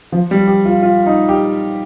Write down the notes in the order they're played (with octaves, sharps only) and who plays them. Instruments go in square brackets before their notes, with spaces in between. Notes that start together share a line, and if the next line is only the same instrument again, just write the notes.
[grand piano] F3
G3
G4
F4
F4
D#4
G4